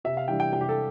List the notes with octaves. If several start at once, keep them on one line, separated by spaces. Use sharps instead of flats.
C3 E5
F5
E3 G3 D4 G5
G5
C3 G5
G4
A4